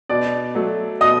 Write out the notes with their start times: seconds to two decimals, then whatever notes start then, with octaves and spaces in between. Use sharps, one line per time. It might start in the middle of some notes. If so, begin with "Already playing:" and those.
0.09 B2 D5 D6
0.55 F#3 A3
1.01 B2 D#5 D#6